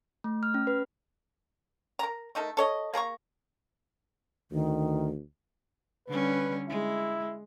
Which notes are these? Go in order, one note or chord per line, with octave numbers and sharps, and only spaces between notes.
A3
F6
C#4
B4
A#4 A#5
A3 D#4 A4 A#4
A4 C#5 D#5
A#3 G#4 A#5 C#6
D2 D#3
D3 G3 C#4 B4
G#3 E4